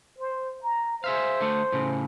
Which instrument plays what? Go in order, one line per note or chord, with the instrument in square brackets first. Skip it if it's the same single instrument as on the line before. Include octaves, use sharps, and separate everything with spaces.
[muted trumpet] C5
A#5
[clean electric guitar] G#4 E5 F5 [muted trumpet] C5
[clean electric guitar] D3 A3
A2 C#3